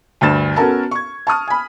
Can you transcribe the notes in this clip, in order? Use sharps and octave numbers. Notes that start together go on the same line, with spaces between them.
D2 G2 F6 A6 E7
B3 C#4 F#4 A4 A#4 A5
C#6 G#6
A5 C#6 D#6 F6
G#5 B5